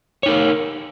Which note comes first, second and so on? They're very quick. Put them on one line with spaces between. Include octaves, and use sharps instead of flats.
C#5 D#4 A#4